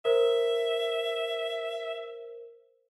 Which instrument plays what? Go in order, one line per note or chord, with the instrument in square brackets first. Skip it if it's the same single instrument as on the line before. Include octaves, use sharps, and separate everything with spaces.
[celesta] A#4 C5 [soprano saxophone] E5